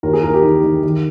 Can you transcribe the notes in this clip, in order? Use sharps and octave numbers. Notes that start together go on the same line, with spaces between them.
D#2 A#4
G#4
D#2 A#4
G4
D#3
D#3
D#3